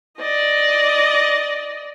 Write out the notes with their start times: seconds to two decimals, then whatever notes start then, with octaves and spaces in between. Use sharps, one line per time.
0.19 D5 D#5